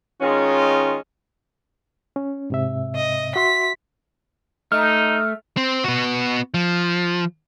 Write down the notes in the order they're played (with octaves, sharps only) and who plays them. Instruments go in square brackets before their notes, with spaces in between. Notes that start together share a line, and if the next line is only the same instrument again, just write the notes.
[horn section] D#3 G#3 C#4 F4
[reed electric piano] C#4
G#2 C3 E5
[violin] D#5
[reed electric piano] F#4 E5 C6 [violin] B6
[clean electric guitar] A3 [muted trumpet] D#4 [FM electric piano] F6
[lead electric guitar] C4
B3 F#4
F3